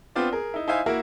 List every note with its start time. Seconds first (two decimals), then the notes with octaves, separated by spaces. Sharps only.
0.15 B3 C4 D4 F4 C5 D5
0.32 G#4 A#4
0.54 D#4 E4
0.68 D#4 E4 C5 E5 F5 G#5
0.86 A#3 E4 F#4 A#4